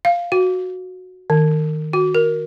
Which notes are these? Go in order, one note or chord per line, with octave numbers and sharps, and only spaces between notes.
F5
F#4
D#3
F#4
A#4